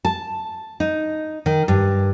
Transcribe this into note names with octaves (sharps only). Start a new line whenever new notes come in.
A5
D#4
D#3
G2